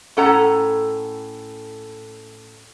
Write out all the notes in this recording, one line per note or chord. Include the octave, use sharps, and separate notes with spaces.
A2 C#4 A4 F#5 A#5